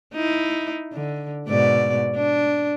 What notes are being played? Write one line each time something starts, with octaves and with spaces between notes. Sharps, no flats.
D#4 E4
D3
G#2 B2 D5
D4